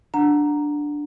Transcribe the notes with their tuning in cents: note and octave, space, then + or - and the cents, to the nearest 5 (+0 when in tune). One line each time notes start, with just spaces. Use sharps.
D4 +0 F#5 -15 A#5 +0